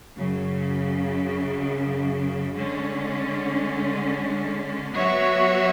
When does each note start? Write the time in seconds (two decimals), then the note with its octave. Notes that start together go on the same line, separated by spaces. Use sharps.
0.16 F#2 C#3 F#3
2.55 D3 G#3 C#4
4.93 F#3 B3 F#4 C#5 E5